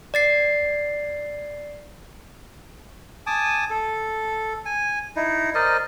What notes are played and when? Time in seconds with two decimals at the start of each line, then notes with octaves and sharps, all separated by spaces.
0.14 D5 A6 C7
3.27 G#5 A5 D6 D#6
3.70 A4
4.66 G#5
5.16 D#4 E4
5.55 A#4 C5 D5 D#5